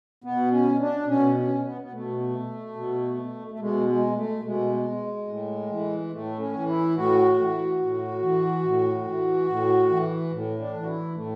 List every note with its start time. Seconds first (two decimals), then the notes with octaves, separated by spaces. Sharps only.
0.24 B2 B3
0.52 C#4
0.80 D4
1.08 B2 C#4
1.36 C#4
1.65 B3
1.81 B3
1.91 B2 A3
2.76 B2
3.51 A3
3.59 B2 G#3
3.88 G#3
4.16 A3
4.43 B2 G#3
5.27 A2
5.69 E3
6.12 A2 A3
6.39 C#4
6.53 E3
6.68 E4
6.96 A2 F#4
7.38 E3
7.79 A2
8.22 E3
8.64 A2
9.05 E3
9.48 A2
9.90 E3
10.32 A2
10.60 D4
10.74 E3
10.81 F#4
10.88 E4
11.15 A2 A3